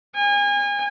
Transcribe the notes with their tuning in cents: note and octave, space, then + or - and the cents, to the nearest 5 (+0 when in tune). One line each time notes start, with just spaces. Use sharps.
G#5 -35